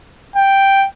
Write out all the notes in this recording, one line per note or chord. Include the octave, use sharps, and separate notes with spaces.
G5